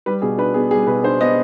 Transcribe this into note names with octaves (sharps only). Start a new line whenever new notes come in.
G3 B4
B2 G#4
D4 B4
B3 G#4
G3 G#4
B2 B4
D4 C5
B3 D#5